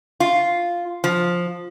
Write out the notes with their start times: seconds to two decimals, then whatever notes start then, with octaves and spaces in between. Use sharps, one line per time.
0.20 F4
1.04 F3